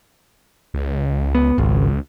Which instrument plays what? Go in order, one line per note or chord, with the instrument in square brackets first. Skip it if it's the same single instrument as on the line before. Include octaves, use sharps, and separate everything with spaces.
[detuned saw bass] C#2
[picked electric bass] B3
[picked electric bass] G#1 [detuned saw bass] C#2